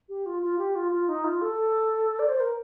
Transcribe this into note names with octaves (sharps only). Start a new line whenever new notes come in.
G4
F4
F4
G4
F4
F4
D#4
F4
A4
D5
C5
A#4